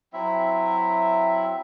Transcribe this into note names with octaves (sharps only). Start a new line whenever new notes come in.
F#3 C4 E4 E5